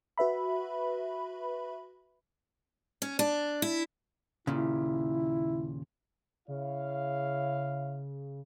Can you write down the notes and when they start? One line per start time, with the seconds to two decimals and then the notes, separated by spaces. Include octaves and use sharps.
0.18 F#4 B4 E5 B5
3.02 C#4
3.19 D4
3.62 E4
4.47 D#2 A#2 C#3 E4
6.48 C#3 E4 C#5 F5